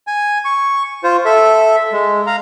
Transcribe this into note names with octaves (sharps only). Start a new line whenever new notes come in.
G#5
C#6
F4 C5
A4 E5
G#3
F5 A#5